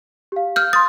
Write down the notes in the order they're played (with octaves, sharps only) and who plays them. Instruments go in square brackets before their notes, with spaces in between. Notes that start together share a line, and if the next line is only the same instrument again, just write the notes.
[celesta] G4 F5
[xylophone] F6 G6
[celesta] C6 A6 [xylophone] D#6